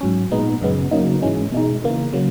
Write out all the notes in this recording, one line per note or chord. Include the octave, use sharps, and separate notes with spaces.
G#2 F#3 C#4
A#2 G#3 B3 D#4
F#2 C#3 G#3 B3
C#3 F#3 A#3 D#4
G#2 E3 G#3 C#4
B2 G#3 D#4
C#3 E3 A#3
C#3 F#3 A#3